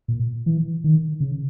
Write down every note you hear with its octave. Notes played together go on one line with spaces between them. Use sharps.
A#2
E3
D#3
C#3